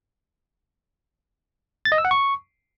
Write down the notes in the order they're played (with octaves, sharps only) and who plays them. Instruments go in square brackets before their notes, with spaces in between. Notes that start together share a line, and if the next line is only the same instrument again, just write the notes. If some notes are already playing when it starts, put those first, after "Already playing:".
[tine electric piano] A6
D#5
E6
F#5
C#6